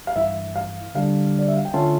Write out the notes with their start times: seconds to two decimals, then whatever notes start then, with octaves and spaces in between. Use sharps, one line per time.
0.07 F5
0.16 G2 E3 A3 E4 E5
0.56 F5
0.95 D3 G3 D4 G4 F5
1.39 D5
1.48 E5
1.57 F5
1.65 G5
1.74 D3 A3 C#4 F4 A5